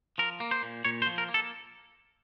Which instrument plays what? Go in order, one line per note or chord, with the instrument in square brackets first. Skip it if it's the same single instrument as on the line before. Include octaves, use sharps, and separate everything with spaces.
[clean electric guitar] F3 A#4
A#3
C5
A#2
A#2 C#5
C5
F3
A#4
A#3
A4